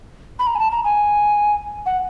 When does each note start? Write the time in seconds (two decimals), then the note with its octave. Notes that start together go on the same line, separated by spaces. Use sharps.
0.39 B5
0.47 A#5
0.55 G#5
0.59 A5
0.72 A#5
0.84 G#5
1.86 F#5